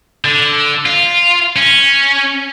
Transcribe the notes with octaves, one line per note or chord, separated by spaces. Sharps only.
D3
F4
C#4